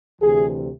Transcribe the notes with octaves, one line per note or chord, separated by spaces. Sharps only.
D2 C3 E3 G#4